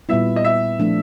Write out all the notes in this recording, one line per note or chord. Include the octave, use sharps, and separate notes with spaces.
A#2 G3 B3 E4 E5
D#5
E5
F3 A3 D4